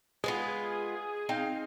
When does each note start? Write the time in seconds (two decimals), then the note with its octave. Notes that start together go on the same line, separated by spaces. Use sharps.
0.24 G#3 B3 F4 G#4
1.29 C4 D#4 F5